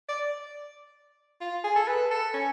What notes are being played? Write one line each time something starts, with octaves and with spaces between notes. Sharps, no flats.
D5
F4
G#4
A4
B4
A4
C#4